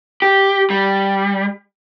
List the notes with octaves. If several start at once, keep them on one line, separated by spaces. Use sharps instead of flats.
G4
G3